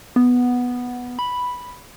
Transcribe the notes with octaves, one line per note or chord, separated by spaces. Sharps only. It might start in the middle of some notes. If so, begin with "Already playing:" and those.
B3
B5